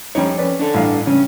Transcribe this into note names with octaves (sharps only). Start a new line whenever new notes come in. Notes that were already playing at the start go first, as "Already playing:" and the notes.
F2 G3 C#4 D#4 C#5
C#4 B4 D5
D4 A4
A1 G2 F5
G2 C#3 C#4